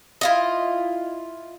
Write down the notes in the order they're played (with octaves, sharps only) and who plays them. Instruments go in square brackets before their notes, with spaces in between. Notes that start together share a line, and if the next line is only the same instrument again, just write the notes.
[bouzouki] E4 F4 D#5